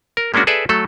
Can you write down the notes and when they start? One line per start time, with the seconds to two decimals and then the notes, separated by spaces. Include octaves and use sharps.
0.17 A#4
0.34 G#3 A#3 C#4 D4 F#4
0.47 G#4 A4 B4 D5 E5
0.69 F#3 A3 A4